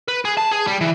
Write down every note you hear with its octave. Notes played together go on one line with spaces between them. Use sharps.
B4
G#4
A5
G#4
G3
E3